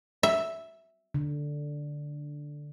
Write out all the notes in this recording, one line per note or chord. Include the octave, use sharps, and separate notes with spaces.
E5
D3